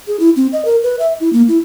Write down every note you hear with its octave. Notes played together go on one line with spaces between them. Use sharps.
G#4
E4
C4
D#5
A#4
B4
E5
E4
A#3
E4